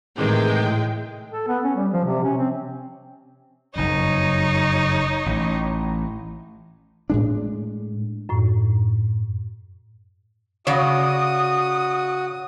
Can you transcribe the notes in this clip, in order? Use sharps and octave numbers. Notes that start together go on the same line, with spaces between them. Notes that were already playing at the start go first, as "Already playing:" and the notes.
A2 C3 D#3 E3 G#3 G5
A4
B3
C#4
G3
F3
C3
C#4
C4
F#1 F2 D#4 C#5
A1
A2 G#3 D4
F#2 A2
C#3 F#4 C#5 D5 D#6